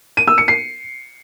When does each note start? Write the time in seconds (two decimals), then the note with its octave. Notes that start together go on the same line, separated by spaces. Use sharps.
0.17 D#7
0.27 E6
0.38 C#7
0.48 C7